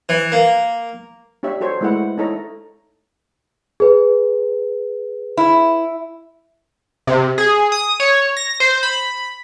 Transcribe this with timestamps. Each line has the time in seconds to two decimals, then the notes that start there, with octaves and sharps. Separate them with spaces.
0.09 E3
0.32 A#3
1.43 D4 G4 C#5 E5
1.61 F#4 A4 C5 C#5
1.81 G#3 A3 E4 B4 C5 F#5
2.18 D#4 E4 A4 C#5 A#5
3.80 G#4 B4
5.37 E4
7.07 C3
7.38 G#4
7.72 D#6
8.00 C#5
8.37 A#6
8.60 C5
8.83 B5